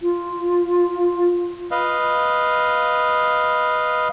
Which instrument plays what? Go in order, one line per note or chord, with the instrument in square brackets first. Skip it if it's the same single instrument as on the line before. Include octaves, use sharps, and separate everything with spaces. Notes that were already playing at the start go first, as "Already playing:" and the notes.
[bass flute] F4
[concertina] B4 D#5 F5